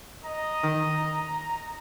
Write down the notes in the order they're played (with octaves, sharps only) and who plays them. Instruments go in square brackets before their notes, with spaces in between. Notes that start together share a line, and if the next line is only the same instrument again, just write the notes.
[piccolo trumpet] D#5 [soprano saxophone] A#5
[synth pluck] D#3